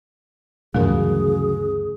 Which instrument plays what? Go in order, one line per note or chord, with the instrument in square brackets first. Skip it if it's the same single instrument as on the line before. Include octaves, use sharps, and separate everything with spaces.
[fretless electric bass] D2 G2 E3 [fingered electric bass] C#3 F#3 [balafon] A3 A#4 [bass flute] G#4